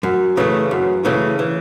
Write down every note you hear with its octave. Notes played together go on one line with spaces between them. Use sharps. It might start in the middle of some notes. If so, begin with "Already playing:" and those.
F#2
C#3 E3 A3
F#2
C#3 E3 A3
E3